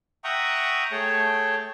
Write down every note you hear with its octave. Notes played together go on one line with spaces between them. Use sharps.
E5 F#5 G5 A#5 C#6 D#6
A3 G#4 C#5 G5 A5